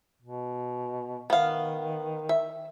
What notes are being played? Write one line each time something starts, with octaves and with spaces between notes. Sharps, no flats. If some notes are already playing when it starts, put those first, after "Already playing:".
B2
D#3 B3 F5
E5